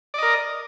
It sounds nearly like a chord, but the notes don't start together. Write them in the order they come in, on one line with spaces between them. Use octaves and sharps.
D5 D#5 A#4